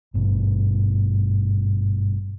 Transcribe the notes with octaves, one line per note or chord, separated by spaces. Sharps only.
G#1 G2 B2